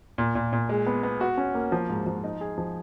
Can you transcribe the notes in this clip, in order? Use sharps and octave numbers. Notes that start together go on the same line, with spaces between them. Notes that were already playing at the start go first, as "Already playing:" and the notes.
A#2
A#2
A#2
G#3
B3
B3
F#4
C#4
A#3
F3
G#2
F3
D#4
G#4
F3